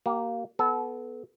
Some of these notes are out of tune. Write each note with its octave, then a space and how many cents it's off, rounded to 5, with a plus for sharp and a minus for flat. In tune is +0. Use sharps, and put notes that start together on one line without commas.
A#3 +0 G4 -35
B3 +0 A4 -25